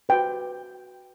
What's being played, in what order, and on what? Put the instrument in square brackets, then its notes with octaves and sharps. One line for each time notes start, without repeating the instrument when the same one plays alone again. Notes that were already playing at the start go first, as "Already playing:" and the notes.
[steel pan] F#4 B4 G5